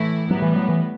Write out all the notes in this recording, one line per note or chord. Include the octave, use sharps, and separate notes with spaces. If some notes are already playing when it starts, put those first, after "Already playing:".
Already playing: A2 E3 A3 E4
A2 F#3 G3 B3
E3
F#3
E3